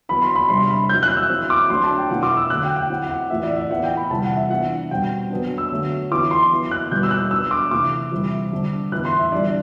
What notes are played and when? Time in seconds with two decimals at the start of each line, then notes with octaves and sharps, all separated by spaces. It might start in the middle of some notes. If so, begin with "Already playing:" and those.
0.09 F#3 B3 E4 B5
0.22 C6
0.35 B5
0.49 C3 G3 D4 C6
0.70 B5
0.89 F#3 C4 E4 G6
1.03 F#6
1.17 E6
1.29 F#3 C4 E4
1.50 D6
1.70 F#3 A3 D4 C6
1.83 A5
1.97 G5
2.09 B2 F#3 A3 E4 F#5
2.23 D6
2.37 E6
2.50 D3 F#3 A3 F#6
2.63 G5
2.76 G5
2.90 F#3 C4 E4 F#5
3.09 F#5
3.30 A2 E3 A3 C4 E5
3.43 D5
3.56 E5
3.71 E3 B3 E4 F#5
3.83 G5
3.97 B5
4.11 C3 E3 G3 A5
4.24 F#5
4.37 E5
4.50 E3 B3 D4 F#5
4.91 B2 G3 C4 G5
5.30 F#3 B3 D4
5.58 E6
5.71 D3 F#3 A3
6.11 E3 B3 E4 D6
6.31 C6
6.52 F#3 B3 E4
6.71 F#6
6.91 B2 G3 B3 E4 G6
7.03 E6
7.11 F#6
7.31 F#3 B3 D4 E6
7.51 D6
7.71 C3 E3 A3 D6
8.12 C3 E3 G3 C4 E4
8.51 D3 G3 D4
8.92 A2 E3 B3 E4 F#6
9.05 C6
9.19 E5
9.32 E3 G3 D4 D5